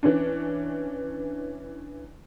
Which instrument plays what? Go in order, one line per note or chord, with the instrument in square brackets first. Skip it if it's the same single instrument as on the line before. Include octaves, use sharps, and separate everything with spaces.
[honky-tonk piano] E3 C#4 D4